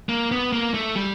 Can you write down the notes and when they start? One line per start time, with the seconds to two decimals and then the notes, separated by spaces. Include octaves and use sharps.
0.09 A#3
0.31 B3
0.52 A#3
0.74 A3
0.96 G3